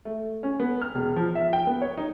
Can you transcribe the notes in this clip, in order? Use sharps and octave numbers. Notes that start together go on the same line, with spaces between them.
A3
C#4
B3
F6
E1
F3
E5
G5
B3
C#5
D#4